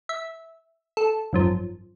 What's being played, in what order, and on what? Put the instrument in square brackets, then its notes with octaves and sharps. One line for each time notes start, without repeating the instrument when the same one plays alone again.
[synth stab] E5
A4
G#1 F#2 F3